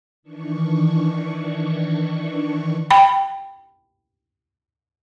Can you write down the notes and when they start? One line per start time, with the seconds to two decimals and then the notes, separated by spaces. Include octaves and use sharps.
0.23 D#3 E3 D4 C#6
2.90 G5 B5